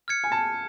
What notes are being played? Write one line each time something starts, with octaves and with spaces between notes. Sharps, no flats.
F6 G#6 C#7
G#5
A5